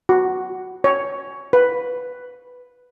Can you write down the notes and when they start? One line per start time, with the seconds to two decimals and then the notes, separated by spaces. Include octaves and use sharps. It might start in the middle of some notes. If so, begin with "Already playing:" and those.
0.09 F#4
0.84 C#5
1.53 B4